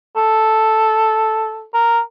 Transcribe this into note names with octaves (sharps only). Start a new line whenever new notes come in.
A4
A#4